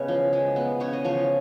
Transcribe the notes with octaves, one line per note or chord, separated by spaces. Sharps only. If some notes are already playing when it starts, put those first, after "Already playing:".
Already playing: C#3 G#3 B3 B4 C#5
F3
G#3
B3
C#3 C#5
D#5
F3 C#5